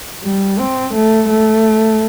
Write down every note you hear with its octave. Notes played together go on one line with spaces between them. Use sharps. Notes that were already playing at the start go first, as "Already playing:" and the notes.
G3
C4
A3
A3